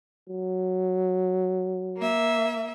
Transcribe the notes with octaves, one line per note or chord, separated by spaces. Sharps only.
F#3
A#3 E5